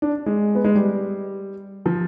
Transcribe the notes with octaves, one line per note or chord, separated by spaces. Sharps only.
D4
G#3
B3
G#3
G3
F3